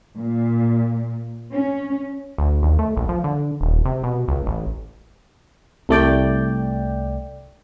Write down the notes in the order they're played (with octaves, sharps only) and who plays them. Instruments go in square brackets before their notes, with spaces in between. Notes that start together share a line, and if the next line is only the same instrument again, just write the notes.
[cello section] A#2
C#4
[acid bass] D2
D#2
A3
A#1
F3
D3
D#1
C3
B2
C#2
A1
[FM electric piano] C2 A3 D5 G5